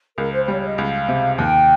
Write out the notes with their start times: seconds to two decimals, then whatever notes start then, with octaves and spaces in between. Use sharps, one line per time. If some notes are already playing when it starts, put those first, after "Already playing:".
0.18 C#2 A#4
0.32 C5
0.43 C5
0.48 G3 C#5
0.58 C#5
0.64 D#5
0.78 C#2 F5
1.09 C3
1.38 D#2 G5